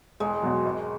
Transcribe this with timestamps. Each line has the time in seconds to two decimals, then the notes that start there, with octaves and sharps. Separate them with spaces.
0.20 E1 G#3
0.42 E2 B2 F#3
0.65 G#1